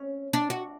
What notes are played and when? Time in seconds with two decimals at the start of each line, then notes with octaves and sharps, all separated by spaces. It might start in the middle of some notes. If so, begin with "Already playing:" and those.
Already playing: C#4
0.33 D4
0.50 F#4